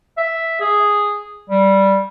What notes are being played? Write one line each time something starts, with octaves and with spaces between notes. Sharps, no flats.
E5
G#4
G3